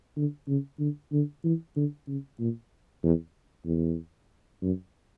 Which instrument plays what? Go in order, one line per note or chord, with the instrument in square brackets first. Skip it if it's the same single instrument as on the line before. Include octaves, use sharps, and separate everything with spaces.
[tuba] D3
C#3
D3
D3
E3
D3
C#3
A#2
E2
E2
F#2